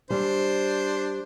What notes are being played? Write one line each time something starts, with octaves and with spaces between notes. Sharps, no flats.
G3 D4 C5